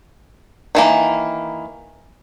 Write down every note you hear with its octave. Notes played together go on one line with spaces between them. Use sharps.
D#3 E3 A#3